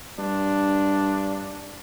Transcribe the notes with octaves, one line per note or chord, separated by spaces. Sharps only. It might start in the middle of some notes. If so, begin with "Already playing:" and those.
G2 D4